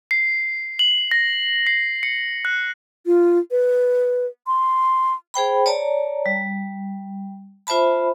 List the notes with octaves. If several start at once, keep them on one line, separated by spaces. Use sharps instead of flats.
C7
F#7
A#6
C7
C#7
F#6
F4
B4
C6
G#4 C5 G5 B5
C#5 D5 A5 A#5
G3
F4 C5 E5 A5 B5